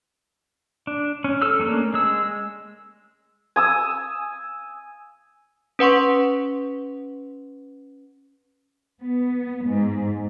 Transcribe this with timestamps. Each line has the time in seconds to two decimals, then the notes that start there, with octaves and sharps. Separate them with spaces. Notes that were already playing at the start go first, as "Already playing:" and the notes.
0.87 D4
1.24 C#4
1.42 A4 E6 F6
1.59 A3 A#3 C#4 D4
1.94 G#3 E6
3.56 G#5 D#6 E6
5.79 C#4 B4 F#5 C6 C#6
9.01 B3
9.66 G#2